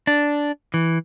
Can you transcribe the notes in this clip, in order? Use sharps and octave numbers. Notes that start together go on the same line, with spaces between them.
D4
E3